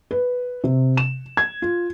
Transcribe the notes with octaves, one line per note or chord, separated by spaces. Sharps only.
B4
C3
E7
G#6
F4